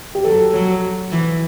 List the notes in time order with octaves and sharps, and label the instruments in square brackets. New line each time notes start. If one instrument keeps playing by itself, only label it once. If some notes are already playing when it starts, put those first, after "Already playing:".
[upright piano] G4
[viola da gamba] F#3 [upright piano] A4
[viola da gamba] F#3
E3